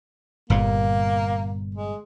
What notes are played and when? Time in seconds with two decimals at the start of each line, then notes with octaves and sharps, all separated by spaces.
0.50 G1 A#2 A#3
1.74 G#3